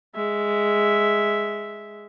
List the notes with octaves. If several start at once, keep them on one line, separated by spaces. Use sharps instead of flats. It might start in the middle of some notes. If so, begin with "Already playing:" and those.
G#3 E5